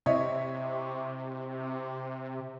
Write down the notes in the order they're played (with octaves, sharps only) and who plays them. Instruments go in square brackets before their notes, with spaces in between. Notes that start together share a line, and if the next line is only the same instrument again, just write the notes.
[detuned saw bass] C3 [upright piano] E4 C#5 D#5